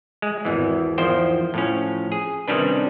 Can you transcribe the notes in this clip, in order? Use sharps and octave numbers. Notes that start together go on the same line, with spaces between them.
G#3
G#1 E2 E3
E2 D#3 F3 C5 G5
A2 F3 C#4
G#4
C3 D#3 G3 C#4 D4 B4